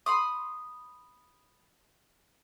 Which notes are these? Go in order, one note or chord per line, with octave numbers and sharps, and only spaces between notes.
B5 C6 D#6